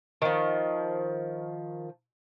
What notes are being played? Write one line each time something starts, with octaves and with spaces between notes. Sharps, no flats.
D#3 F3